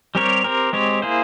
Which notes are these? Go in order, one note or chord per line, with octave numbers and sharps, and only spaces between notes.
G3 C4 G4 A#4 C#5
C4 G4 A#4
G#3 C4 G4 C#5
A#3 E4 G#4 C5